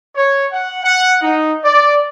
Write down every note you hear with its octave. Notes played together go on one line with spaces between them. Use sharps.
C#5
F#5
F#5
D#4
D5